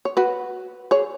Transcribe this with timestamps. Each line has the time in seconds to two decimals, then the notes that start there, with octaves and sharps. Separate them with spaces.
0.05 C#5
0.17 F#4 B4
0.91 G#4 C#5